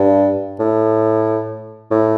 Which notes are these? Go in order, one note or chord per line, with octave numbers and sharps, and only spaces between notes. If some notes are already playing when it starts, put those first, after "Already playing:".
Already playing: G2
A2
A2